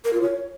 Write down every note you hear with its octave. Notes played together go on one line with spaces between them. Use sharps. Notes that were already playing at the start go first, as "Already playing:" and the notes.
A#4
F4
C#5